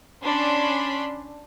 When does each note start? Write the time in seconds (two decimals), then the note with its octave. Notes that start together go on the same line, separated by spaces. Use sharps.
0.22 C#4 D4 B5 C6